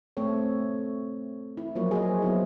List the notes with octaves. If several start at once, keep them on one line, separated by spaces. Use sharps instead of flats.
A3 C4 A4 C#5
E4
F3 F#3 A#3 C#5
G#4 C5 D#5
F#3 B3 E4